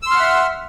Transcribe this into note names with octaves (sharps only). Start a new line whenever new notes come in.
E5 F#5 C6 E6 F6